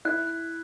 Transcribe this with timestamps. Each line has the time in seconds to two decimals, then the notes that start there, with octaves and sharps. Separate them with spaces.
0.05 E4 F#6
0.27 F#6